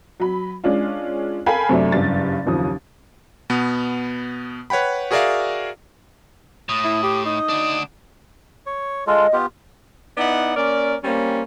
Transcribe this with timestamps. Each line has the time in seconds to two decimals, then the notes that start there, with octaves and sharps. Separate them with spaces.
0.20 F#3 B5
0.64 G#3 C#4 D4 F4
1.46 A4 A#4 F5 G5 G#5 B5
1.69 F#2 C3 A3 C#4 D4
1.92 F#1 G2 A6
2.46 F#1 D#2 F3 D#6
3.50 B2 B3
4.70 B4 C#5 F#5 G5 B5
5.11 F#4 G#4 A#4 D5 E5 F5
6.69 A2 D#6
6.84 E4
7.03 G4
7.25 D#4 D#6
7.49 D2 D4
8.66 C#5
9.07 G#3 F4 A4 D#5
9.33 B3 F4 G4
10.17 B3 D#4 E4 D5 F#5
10.56 A#3 C#4 A#4 D5
11.04 G3 A#3 C4 C#4